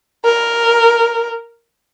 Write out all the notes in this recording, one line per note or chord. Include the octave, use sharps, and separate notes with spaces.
A#4